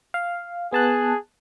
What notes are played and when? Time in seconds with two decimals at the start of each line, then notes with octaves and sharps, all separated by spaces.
0.14 F5
0.73 B3 G#4 A5 F#6